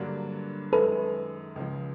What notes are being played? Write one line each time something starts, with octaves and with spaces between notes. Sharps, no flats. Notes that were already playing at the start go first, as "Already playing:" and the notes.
Already playing: G2 D3 F#3 A#3 D4
F#2 D#3 G#3 A4 B4
C#2 C#3 F3